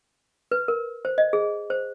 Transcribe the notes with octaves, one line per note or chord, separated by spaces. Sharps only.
B4
A#4
C5
D#5
G#4
C5